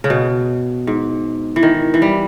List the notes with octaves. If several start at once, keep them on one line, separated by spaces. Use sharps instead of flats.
C#3
B2
G#2
E3
D#3
E3
G3